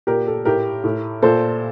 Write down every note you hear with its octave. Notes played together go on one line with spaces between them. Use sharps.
A#2 G4 A#4
A4
A2 G4 A#4
A2
A#2 A4 C5